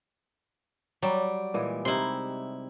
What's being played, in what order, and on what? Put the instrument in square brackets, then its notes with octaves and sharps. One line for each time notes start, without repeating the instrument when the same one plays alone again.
[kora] F#3 [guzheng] G3
[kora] A#2 E3 G#3
[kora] C3 D#4 [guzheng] E4 C6